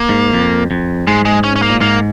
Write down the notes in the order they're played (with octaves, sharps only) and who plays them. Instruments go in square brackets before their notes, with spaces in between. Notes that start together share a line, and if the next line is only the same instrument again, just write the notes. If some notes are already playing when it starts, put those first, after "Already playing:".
Already playing: [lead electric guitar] A#3
[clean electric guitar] G#2
F2
F2
[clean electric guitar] G#2 [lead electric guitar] G#3
[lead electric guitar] G#3
C#4
C#4
A#3
[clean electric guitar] A#2
[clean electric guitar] G#2 [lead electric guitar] A#3